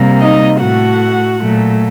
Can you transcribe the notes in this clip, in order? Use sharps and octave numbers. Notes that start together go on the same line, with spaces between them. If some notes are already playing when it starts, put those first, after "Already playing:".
Already playing: C3 G3 A#3
D#4 D#5
A2 A3 F#4 F#5
A#2 F#3 A3